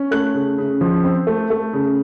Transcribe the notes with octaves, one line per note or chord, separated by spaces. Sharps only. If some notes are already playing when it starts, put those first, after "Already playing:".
Already playing: C#4
A3 F#6
C#3
C#3
F3
C4
A3
A3
C#3